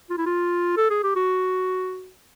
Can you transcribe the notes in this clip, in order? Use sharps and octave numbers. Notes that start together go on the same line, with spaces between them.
F4
E4
F4
A4
G#4
G4
F#4